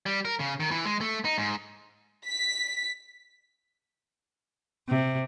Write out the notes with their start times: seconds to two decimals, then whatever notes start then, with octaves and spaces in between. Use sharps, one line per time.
0.06 G3
0.25 A#4
0.40 C#3
0.60 D#3
0.71 E3
0.85 G#3
1.01 A3
1.25 D#4
1.38 G#2
2.27 B6
4.88 C3